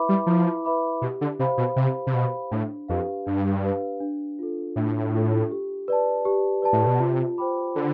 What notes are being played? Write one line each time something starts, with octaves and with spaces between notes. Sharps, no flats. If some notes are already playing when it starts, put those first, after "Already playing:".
Already playing: E4 B4 E5 B5 D6
G3
F3 E4
B4 E5 B5 D6
B2 G4
D3
C3 C5 F5 B5
B2
C3 G4
C3
B2 C5 F5 B5
A2 D4
F2 G4 B4 F5
G2 D4
G4 B4 F5
D4
F4 A4
A2 D4
F4 A4
G4
B4 D5 A5
G4
B4 D5 A5
A2
B2
C3 F4
C5 G5 B5 D6
D3 F4